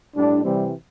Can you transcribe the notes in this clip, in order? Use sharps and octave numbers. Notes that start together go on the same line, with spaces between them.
A2 G3 D4
C3 E3 G3 C4